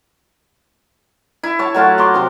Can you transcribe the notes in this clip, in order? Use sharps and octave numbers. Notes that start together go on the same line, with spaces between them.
E4
C#5 A5
F#3 A3 F4 F#4
A#5 C6 D6
C3 F3